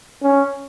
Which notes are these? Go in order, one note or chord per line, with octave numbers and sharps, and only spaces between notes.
C#4